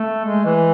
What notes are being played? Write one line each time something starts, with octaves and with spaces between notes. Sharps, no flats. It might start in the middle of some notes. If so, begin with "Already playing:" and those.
Already playing: A3
G#3
E3